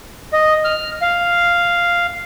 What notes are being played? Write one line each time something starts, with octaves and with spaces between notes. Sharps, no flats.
D#5
F6
F5